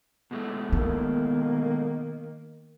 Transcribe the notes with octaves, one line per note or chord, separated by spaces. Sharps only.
B2 G#3 A3
D#3 A#3 B3